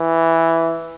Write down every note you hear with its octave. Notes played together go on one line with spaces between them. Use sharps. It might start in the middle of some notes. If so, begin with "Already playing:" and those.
Already playing: E3